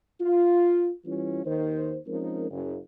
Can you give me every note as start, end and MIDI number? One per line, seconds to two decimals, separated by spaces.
0.21 0.91 65
1.05 1.43 52
1.05 1.43 55
1.05 1.43 61
1.05 1.43 64
1.05 1.43 65
1.45 1.96 39
1.45 1.96 51
1.45 1.96 72
2.07 2.48 53
2.07 2.48 56
2.07 2.48 60
2.07 2.48 61
2.07 2.48 63
2.07 2.48 70
2.51 2.76 30